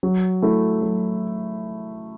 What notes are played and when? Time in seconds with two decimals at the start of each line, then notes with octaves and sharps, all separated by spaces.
0.03 F#3
0.42 A3 E4 A4
0.82 F#3